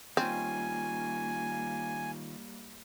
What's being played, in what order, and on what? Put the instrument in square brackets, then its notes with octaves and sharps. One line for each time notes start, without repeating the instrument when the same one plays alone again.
[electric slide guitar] D#3 C#4 F4 [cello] G3 A#3 [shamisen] C4 [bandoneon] G#5